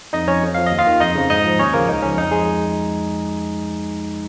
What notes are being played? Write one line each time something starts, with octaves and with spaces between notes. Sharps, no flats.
F2 D#4 D#5
F3 C#4 C#5
F2
F3 F5
D#2 D#5
F4 F5
D#3
F2 D#4 D#5
C#3 F3
G#2 D#4 D#5
F3
D#2 C#4 C#5
C#3 F3 A#3 A#4
C#2 D#4
C#3 F3 C#4
F2 D#4
F3 G#3 G#4